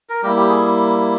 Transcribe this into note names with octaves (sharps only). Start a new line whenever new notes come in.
A#4
G3 A#3 E4 G4
G4
G#4